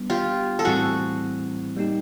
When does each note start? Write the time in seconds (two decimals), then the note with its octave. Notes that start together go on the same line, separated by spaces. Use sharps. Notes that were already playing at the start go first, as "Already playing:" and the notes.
Already playing: G3 B3 D4
0.10 F4 G4
0.59 A4
0.65 A2 E3 G3 C4 E4 F#4 G#4
1.76 G3 A#3 D#4 G4